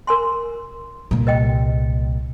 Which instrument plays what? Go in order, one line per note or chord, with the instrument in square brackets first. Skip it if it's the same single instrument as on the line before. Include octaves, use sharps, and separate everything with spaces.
[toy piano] A#4 G#5 C6
[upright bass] C2 A#2
[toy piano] B4 D#5 G5